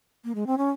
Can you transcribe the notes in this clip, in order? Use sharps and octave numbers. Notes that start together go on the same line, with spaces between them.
A#3
G#3
C4
C#4